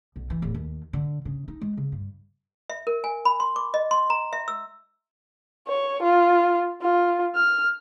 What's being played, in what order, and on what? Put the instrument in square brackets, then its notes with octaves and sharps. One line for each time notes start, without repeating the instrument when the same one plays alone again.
[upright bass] B1
E3
D1
D#2
D3
C#3
D#4
G#3
C#3
G2
[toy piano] E5
A#4
G#5
B5
C6
D6
D#5
C6
A#5
E5
E6
[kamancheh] C#5
F4
F4
F6